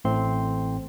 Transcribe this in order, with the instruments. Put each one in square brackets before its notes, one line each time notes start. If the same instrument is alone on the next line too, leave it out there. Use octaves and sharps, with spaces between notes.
[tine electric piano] A1 A2 A3 C4 C6